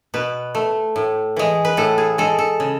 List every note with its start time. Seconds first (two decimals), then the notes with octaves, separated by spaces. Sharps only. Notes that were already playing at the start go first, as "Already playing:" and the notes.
0.14 B2 B4
0.55 A3
0.96 A2
1.36 E3 G#3
1.65 B4
1.77 A2 A4
1.98 G#4
2.18 G#3 A4
2.39 A4
2.60 C#3